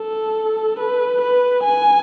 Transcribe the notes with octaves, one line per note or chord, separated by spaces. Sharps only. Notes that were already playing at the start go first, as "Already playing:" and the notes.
Already playing: A4
B4
B4
G#5